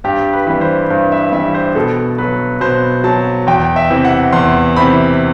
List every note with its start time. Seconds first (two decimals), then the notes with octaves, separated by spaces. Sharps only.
0.04 G2 G4
0.33 B4
0.46 E3 G3
0.61 C5
0.90 G2 C5
1.12 E5
1.32 E3 G3 E5
1.54 C5
1.75 B2 A4
2.18 F#3 B4
2.61 B2 C5
3.04 F#3 A5
3.47 E2 G5
3.76 E5
3.90 C3 E3
4.05 F#5
4.32 E2 C6
4.76 C3 E3 B5